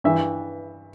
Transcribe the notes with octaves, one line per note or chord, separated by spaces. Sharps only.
G2 E3 E5